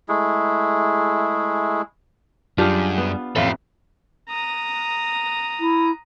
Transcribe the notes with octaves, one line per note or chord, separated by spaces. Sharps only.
G#3 A3 E4 G#4
F#2 G3 D4 F4 G4 G#4 F5
B3
A1 F2 A4 C#5 F5 G5
A#5 D#6
E4